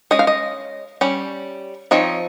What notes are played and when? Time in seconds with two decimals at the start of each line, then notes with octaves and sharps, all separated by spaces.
0.11 G#3 C#4 D#5
0.19 F5
0.27 D#5
1.01 G3 C#4
1.91 F3 C4 D#4 C#5